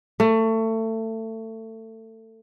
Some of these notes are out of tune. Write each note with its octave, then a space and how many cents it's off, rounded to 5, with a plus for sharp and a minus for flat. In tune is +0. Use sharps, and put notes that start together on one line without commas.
A3 +25